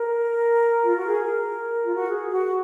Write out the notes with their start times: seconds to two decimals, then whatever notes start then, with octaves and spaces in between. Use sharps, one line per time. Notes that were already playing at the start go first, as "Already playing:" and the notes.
Already playing: A#4
0.83 F4
0.96 F#4
1.08 G#4
1.22 A#4
1.84 F4
1.96 F#4
2.08 G#4
2.30 F#4